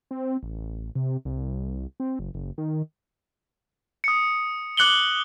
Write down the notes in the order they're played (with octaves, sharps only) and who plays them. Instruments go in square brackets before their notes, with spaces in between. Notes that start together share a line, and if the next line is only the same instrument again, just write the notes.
[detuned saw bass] C4
A1
C3
C2
C4
F#1
F#1
D#3
[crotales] D#6 C#7
D6 F#6 C#7 F#7 G7